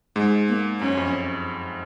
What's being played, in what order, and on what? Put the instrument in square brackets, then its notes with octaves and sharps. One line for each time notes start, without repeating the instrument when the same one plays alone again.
[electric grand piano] G#2 [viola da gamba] G#3
[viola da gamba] A#3
[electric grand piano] F#2 [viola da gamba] C#4
[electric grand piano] F2